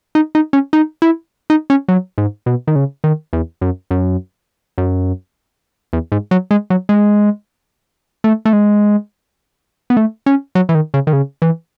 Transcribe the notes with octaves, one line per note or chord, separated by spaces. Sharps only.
D#4
D#4
C#4
D#4
E4
D#4
C#4
F#3
G#2
B2
D#3
C#3
D#3
E2
F#2
F#2
F#2
E2
G#2
F#3
G#3
F#3
G#3
A3
A3
G#3
B3
A3
C#4
F#3
E3
D#3
C#3
D#3
C#3
E3